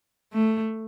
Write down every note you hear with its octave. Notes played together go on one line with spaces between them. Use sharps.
A3